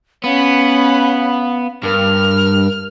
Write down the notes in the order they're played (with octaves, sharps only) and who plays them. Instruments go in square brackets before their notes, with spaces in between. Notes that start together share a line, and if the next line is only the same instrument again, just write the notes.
[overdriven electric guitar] B3 [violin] C#4 B5 [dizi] F5
[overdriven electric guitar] G2 [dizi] A#4 [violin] F6